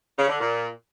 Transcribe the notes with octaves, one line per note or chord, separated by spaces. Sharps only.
C#3
D3
A#2